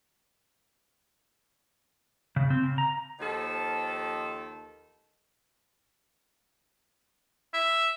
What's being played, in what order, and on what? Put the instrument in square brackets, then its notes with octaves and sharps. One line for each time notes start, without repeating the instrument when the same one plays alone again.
[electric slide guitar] C#3
C4
C#3
A#5
[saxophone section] D#2 D#3 F3 A4
[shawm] E5